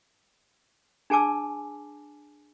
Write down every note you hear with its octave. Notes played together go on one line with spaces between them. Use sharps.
D4 G#4 G#5 A5 D6 E6